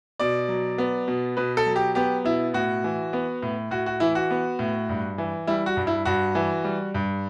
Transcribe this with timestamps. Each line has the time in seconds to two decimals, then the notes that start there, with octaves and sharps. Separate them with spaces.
0.20 B2 D5
0.48 F#3
0.78 B3
1.08 B2
1.37 B2 B4
1.57 A4
1.66 F#3
1.76 G4
1.95 B3 G4
2.24 B2 E4
2.54 A2 F#4
2.84 E3
3.13 B3
3.42 A2
3.71 A2 F#4
3.86 F#4
4.00 E3 E4
4.15 F#4
4.31 B3
4.59 A2
4.89 G2
5.18 E3
5.47 G3 E4
5.66 F#4
5.77 G2
5.87 E4
6.05 G2 F#4
6.35 E3
6.64 G3
6.94 G2